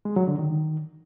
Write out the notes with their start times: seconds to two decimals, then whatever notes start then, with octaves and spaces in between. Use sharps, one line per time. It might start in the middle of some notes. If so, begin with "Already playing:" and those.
0.05 G#3
0.16 F#3
0.27 D3
0.39 D#3